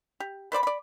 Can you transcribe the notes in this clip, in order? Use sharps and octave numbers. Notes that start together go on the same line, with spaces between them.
G4
B4 C5 D5 B5
D5 B5